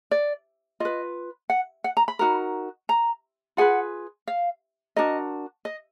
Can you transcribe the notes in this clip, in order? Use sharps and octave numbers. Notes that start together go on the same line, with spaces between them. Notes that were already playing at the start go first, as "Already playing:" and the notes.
D5
F4 B4 D#5
F#5
F#5
A#5
B5
D#4 F#4 A#4
A#5
F4 G#4 B4 F#5
F5
D4 F#4 A#4 D#5
D#5